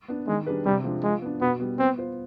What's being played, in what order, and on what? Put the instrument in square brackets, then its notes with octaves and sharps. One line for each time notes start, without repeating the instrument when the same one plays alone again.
[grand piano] B3 D4
[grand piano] D#3 [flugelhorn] G#3
[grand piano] G3 D4 G#4 B4
[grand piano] C3 [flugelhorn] G3
[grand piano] F3 G#3 D4
[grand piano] F3 [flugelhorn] G#3
[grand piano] B3 D4
[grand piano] B2 [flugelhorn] B3
[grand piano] G3 B3
[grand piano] B3 [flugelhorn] C4
[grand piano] F4 C5